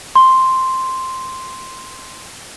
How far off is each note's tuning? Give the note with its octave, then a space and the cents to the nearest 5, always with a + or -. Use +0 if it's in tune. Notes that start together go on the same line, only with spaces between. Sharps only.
C6 +0